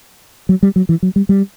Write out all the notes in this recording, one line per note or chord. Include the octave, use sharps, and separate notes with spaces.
F#3
G3
F#3
E3
F#3
G3
G3